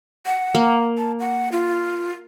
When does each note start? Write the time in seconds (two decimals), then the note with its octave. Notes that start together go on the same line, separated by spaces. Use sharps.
0.26 F#5
0.55 A#3
0.98 A5
1.20 F#5
1.52 F4